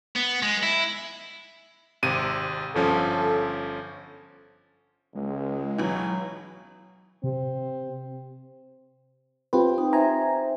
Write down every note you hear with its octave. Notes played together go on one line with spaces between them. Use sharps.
B3
G#3
E4
G#1 C3 D#7
G1 F3 C#4 A4
C#2 G#3
C#2 B2 E3 F#3
C3 C4
C4 F4 G4 B4
D#4
C5 E5 G#5 A#5